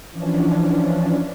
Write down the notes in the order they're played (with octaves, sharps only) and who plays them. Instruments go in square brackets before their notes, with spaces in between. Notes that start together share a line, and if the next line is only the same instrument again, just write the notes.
[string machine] E3 F3 C#4 D4